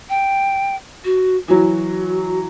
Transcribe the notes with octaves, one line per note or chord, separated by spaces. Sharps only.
G5
F#4
E3 F#3 F#4